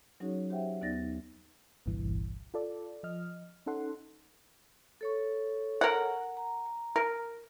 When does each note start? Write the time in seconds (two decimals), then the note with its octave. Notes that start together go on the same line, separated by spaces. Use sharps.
0.20 F#3 C#4 D#4 F#4 G#4 C#5
0.50 G4 C5 E5 F#5 G5
0.81 D#2 B3 D#4 D5 A6 A#6
1.86 G1 C2 G2 A#2 E3
2.54 F4 A4 D5
3.03 F3 D#5 F6
3.66 C#4 D#4 A4 F#5 C6
5.01 A4 C#5 C#6
5.81 A#4 F#5
6.37 A#5
6.96 A#4